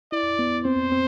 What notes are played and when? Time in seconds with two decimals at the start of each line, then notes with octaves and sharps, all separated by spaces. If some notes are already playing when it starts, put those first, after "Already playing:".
0.12 E4 D5
0.39 B3
0.65 C4 C5
0.92 C4